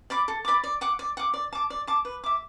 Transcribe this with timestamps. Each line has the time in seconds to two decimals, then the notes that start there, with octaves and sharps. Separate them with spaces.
0.10 D5 B5 D6
0.28 A4
0.45 D5 B5 D6
0.64 D5
0.81 F#5 D6
0.99 D5
1.17 F#5 D6
1.34 D5
1.53 A5 D6
1.70 D5
1.87 A5 D6
2.05 B4
2.24 E5 D6